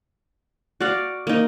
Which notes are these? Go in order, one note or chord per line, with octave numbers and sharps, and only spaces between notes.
F#4 D5 F5 F#5
A#3 D#4